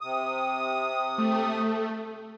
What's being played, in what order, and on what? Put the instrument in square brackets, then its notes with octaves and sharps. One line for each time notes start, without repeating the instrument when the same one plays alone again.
[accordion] C3 D#6
[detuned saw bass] A3